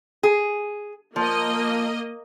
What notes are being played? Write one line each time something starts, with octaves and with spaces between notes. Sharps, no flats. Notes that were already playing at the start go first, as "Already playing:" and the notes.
G#4
F3 A#3 D#5